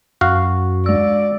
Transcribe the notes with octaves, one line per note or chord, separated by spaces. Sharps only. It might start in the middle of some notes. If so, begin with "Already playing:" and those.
F#2 F#4 F5
G#3 D5 E6